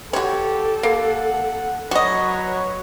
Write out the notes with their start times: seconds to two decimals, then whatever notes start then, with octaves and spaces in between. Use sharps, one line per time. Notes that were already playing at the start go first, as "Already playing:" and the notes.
0.13 F#4 G4 A4 C#5
0.83 A#3 F#5
1.91 F#3 F#4 B4 C#5 D#5